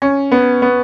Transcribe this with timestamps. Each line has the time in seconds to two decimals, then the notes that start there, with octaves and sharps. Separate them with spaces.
0.02 C#4
0.32 B3
0.62 B3